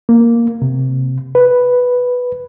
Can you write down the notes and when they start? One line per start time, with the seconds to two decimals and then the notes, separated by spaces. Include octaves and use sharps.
0.09 A#3
0.62 C3
1.35 B4